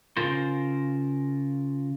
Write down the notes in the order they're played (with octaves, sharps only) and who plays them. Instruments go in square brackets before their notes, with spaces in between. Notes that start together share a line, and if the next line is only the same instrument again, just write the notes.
[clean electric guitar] C#3 F4 A#4 C5